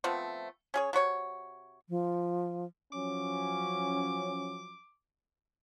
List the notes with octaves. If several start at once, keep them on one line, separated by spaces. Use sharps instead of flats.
F3 A3 B3 C4
C#4 G#4 C#5
C3 F#4 C#5 C#6
F3
F3 F#3 C#4 D6